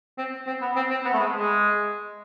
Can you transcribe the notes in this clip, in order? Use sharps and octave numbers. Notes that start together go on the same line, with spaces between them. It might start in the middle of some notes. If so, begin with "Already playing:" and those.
C4
C4
B3
C4
C4
B3
A3
G#3
G#3